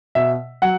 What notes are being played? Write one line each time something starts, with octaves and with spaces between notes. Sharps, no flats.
B2 E5
F#3 F#5